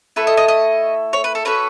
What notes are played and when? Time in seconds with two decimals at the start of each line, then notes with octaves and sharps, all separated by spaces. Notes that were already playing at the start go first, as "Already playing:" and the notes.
0.16 A3 E4 A4 B4
0.27 D#5
0.37 D#5
0.48 D#5
1.13 C#5
1.24 B4
1.35 A4
1.45 C#4 F#4 A4 B4